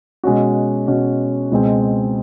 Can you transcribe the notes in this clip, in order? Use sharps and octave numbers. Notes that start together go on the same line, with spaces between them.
B2 G#3 C#4 F#4
B2 G#3 C#4 F#4
C#2 B2 G#3 C4